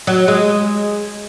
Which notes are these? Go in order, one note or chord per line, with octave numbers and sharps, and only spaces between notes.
F#3
G#3